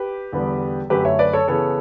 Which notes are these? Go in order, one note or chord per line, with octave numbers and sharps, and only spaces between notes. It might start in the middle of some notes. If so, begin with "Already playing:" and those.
Already playing: G4 B4
E2 D3 G3 B3
F#2 D3 A3 G4 B4
C#5 E5
B4 D5
A4 C#5
C#3 E3 B3 A4 C#5